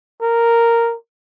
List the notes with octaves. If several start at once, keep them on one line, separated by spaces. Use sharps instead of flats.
A#4